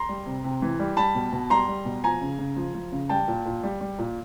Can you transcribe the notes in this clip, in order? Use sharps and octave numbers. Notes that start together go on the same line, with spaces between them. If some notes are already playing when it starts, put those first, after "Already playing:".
Already playing: A#5 C6
G3
C3
C3
E3
G3
G3 A5 B5
B2
B2
G3 A#5 C6
G3
B2
F3 G#5 A#5
C#3
C#3
F3
F3
C#3
G3 G5 A5
A#2
A#2
G3
G3
A#2